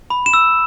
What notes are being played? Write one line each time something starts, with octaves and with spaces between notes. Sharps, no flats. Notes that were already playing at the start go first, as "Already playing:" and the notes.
B5
E7
E6